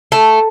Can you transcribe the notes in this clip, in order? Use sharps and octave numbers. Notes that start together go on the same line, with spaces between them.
A3